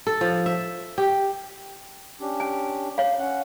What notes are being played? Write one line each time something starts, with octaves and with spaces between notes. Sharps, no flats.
A4
F3
E5
G4
C#4 D4 G4
G#5
C#5 F5
C#4 F#5